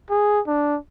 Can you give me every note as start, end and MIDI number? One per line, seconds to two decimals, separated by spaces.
0.10 0.40 68
0.47 0.77 62